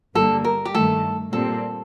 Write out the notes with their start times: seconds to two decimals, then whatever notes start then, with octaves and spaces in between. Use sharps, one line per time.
0.15 G1 G2 D3 G3 A#3 A4
0.44 A#4
0.65 G4
0.74 G2 D#3 A3 A4
1.33 A#2 G3 C4 A4